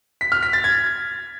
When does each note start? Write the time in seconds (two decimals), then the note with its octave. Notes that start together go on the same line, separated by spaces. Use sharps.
0.21 B6
0.32 F6
0.43 B6
0.53 A6
0.64 G#6